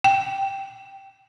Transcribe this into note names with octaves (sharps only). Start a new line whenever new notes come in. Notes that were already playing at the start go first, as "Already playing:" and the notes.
G5